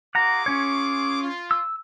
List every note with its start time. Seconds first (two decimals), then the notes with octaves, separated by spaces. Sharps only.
0.15 F4 G#4 F#5 A#5 D6
0.46 C#4 C#5
1.21 F4
1.51 E6